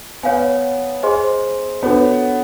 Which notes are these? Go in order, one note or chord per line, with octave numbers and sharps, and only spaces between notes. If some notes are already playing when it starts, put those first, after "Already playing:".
B3 C#5 F5 G#5
G#4 C5 D#5 G#5 C6
B3 D4 F#4 A4 C#5